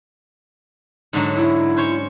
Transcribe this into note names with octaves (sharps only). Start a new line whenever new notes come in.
G#2 D3 F#3
E4
C#4 C5 C#5